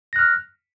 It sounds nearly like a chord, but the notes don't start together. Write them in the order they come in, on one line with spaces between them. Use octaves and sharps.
A#6 F#6 F6